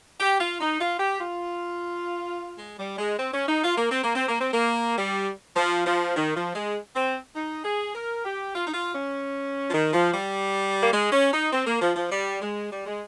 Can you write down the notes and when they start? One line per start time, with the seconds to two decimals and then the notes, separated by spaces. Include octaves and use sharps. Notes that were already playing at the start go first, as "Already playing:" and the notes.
0.20 G4
0.40 F4
0.61 D#4
0.81 F4
0.99 G4
1.20 F4
2.59 G#3
2.79 G3
2.98 G#3
3.18 C4
3.34 C#4
3.48 D#4
3.64 F4
3.78 A#3
3.91 C4
4.03 A#3
4.15 C4
4.28 A#3
4.41 C4
4.53 A#3
4.98 G3
5.56 F3
5.86 F3
6.17 D#3
6.36 F3
6.56 G#3
6.96 C4
7.36 D#4
7.64 G#4
7.95 A#4
8.24 G4
8.55 F4
8.67 D#4
8.74 F4
8.94 C#4
9.68 F3
9.74 D#3
9.93 F3
10.13 G3
10.82 A#3
10.93 G#3
11.12 C#4
11.33 D#4
11.53 C4
11.67 A#3
11.81 F3
11.96 F3
12.12 G3
12.42 G#3
12.71 G3
12.86 G#3